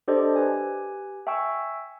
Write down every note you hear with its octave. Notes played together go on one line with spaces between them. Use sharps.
D4 G4 A4 C5 D5 D#5
G4 B4 G#5
E5 G5 G#5 C#6 E6